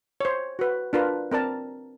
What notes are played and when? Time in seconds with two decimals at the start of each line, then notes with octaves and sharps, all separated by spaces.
0.20 C5 C#5
0.59 F#4 B4
0.93 D4 F4 A#4 B4
1.32 C4 A#4 D5 A5 A#5